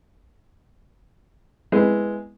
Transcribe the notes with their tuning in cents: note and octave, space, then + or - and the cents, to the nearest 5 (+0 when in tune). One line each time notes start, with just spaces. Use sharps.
G#3 +0 B3 +0 E4 +0